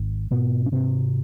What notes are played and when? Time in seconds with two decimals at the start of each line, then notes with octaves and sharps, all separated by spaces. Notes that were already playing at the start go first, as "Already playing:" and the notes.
Already playing: G#1
0.31 G#2 B2 B3
0.66 C#4
0.71 G#2 C3 C4